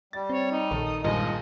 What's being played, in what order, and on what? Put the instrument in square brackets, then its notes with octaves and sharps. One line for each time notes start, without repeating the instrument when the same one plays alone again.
[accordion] G3 [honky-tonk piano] A6
[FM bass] C4 [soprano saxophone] C#5
[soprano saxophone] D#4
[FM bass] A#1 [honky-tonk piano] D#3 A4
[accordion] D#6
[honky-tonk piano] G2 A#2 D#3 [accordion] F3 G#3 [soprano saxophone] D#5